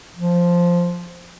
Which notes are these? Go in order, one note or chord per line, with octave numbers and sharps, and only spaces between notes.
F3